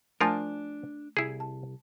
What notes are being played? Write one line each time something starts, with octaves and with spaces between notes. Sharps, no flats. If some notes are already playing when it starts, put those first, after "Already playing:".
F3 A3 D4 F4 A#4 G#5 A5
C2 E4 G#4
A5